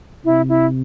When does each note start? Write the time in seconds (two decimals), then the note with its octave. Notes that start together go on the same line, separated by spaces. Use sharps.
0.25 C3 E4
0.49 E4